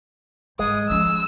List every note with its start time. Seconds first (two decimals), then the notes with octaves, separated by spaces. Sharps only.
0.59 G#2 G3 G#3 D#6
0.89 F3 C#4 E6